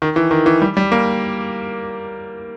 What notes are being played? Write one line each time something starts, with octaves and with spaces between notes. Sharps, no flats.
D#3
E3
D#3
E3
G3
G3
A#3